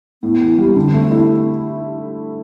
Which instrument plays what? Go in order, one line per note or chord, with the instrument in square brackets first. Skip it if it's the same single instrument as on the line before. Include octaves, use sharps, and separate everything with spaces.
[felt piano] A2 [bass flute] B3
[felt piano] E3
G3
[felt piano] D3 [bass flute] C4
[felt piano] A3
E4